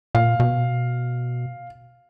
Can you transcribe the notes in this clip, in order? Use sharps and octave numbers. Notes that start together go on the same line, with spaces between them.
A#2 F5
B2